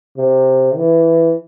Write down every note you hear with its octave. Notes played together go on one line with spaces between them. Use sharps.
C3
E3